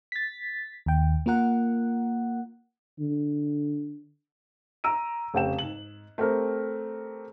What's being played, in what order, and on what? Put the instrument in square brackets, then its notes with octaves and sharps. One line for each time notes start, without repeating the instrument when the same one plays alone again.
[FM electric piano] A6 B6
D#2 G5
A#3 F4 A#4 F#5
[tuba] D3
[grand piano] A#5 E6 D7 D#7
F1 C#3 G5 E7
G#2 F#7
A3 C4 G4 A#4